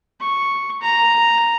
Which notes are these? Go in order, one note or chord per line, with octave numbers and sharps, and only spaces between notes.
C#6
A#5